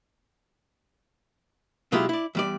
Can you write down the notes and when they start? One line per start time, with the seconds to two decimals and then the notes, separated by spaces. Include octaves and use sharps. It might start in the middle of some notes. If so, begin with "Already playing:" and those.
1.92 B2 F#3 G#3 E4 F4 G4
2.09 E4 D5
2.35 E2 G3 D5